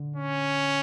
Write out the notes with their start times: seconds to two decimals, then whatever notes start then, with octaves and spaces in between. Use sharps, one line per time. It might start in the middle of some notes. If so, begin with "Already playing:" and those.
Already playing: D3
0.16 C#4